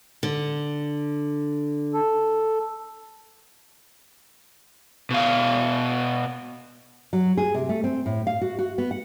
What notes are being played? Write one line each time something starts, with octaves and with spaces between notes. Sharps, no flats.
D3
A4
B2 F5
F#3
G#4
C3
A3
C4
A2
F5
F#4
F#4
B3
F#5